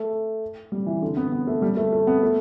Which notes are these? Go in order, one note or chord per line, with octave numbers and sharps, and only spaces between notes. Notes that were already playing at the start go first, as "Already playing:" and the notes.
Already playing: A3
G3
E3
D3
B3
B3
A3
G3
A3
A3
B3
A3